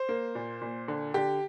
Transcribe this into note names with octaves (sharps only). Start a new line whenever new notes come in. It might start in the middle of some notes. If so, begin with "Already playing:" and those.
Already playing: C5
A#3
A#2
A#2
D3
D3 G4